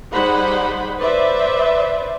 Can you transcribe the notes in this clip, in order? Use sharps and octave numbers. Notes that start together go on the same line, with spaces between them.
G3 D#4 G#4 C5 F#5 B5
B4 C5 D5 E5